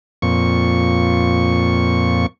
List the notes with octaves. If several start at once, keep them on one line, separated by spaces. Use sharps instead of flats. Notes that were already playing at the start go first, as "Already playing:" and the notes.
F2 A#2 C#6